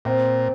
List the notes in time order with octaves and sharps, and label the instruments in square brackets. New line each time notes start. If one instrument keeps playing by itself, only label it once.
[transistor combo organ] A#2 [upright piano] C4